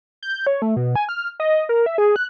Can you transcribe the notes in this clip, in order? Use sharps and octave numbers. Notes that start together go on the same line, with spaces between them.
G6
C#5
A3
B2
G#5
F6
D#5
A#4
E5
G#4
F#6